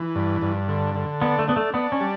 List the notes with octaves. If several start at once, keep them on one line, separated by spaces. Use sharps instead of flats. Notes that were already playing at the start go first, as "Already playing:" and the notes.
Already playing: E3
G2
G2
D3
D3
B3 D4
A3
B3 D4
A3
B3 D4
C#4
G3